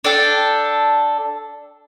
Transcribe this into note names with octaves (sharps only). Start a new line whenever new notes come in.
D4 A4 G5